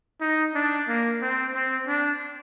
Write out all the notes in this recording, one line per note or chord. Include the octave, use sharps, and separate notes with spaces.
D#4
D4
A#3
C4
C4
D4